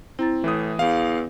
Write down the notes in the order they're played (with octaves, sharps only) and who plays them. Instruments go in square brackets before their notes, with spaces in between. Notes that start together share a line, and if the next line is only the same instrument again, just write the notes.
[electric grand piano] C4 [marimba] E4 A#5 A6
[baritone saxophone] A2 [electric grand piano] E3 D#6
[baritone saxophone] E2 [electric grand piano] F5